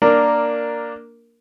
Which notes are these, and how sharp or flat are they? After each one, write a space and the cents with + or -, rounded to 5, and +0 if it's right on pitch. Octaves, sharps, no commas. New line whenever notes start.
A#3 +0 D4 +0 A#4 -5